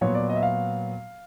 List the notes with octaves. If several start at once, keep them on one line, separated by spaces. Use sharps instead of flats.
A#2 F#3 B3 C#5
D5
D#5
E5
F5